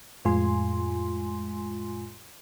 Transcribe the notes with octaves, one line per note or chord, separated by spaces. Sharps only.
F2 A2 G#3 F4 G#5 C6